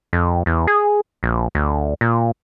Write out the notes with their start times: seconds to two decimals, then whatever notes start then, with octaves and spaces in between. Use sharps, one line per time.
0.13 F2
0.46 E2
0.67 G#4
1.23 A#1
1.55 D2
2.01 A#2